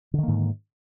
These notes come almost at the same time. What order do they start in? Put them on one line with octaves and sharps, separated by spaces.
D3 D#3 A#3 G#2